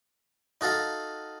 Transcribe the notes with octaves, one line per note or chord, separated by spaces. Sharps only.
D#4 F#4 A4 F5 A#5